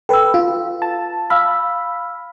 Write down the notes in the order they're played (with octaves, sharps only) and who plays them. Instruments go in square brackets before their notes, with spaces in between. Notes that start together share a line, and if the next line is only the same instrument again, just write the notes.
[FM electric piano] A4 B4 [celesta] G5 E6
[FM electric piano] F4 [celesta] F5
[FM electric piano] A5
[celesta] F5 E6 F6 [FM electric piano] B5